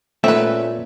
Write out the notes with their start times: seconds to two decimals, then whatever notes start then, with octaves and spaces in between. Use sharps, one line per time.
0.24 A#2 A3 C4 C#4 A4 B4 E5